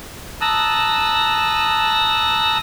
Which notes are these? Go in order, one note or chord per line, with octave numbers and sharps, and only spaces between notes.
A5 A#5 D#6 E6 F#6